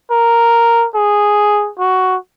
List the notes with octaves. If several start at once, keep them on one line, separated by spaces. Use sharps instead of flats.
A#4
G#4
F#4